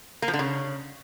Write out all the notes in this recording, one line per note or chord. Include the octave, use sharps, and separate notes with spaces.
A#3
F3
D3
C#3